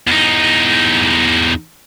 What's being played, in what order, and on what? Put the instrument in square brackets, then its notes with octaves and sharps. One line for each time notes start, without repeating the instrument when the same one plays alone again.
[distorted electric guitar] E2 D#4